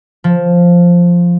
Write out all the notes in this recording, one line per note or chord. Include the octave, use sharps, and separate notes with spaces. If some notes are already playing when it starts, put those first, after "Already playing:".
F3